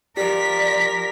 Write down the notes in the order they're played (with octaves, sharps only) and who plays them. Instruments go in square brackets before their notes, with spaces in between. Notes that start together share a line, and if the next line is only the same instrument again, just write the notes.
[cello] F3 A#4 [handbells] G4 [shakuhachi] D5 [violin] B6